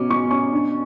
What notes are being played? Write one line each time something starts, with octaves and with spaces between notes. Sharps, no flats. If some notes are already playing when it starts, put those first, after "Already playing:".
Already playing: B2 C#4 D6
B2 C#6
C#4 C#6
D4